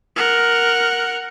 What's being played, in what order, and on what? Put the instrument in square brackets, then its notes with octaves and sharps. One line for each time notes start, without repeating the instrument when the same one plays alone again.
[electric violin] A#4 F#5